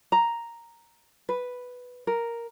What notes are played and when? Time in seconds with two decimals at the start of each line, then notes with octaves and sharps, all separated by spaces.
0.12 A#5
1.29 B4
2.07 A#4